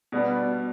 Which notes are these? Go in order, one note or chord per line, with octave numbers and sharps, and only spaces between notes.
B2 G3 B3 D4